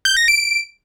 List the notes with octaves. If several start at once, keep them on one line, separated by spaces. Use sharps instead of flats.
G6
A#6
D7